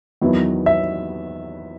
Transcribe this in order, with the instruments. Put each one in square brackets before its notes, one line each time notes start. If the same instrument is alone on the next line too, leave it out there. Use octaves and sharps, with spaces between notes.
[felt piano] E2 D#3 F#3 B3 E4
[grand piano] E5